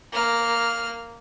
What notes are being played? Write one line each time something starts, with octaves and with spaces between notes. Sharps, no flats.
A#3 F6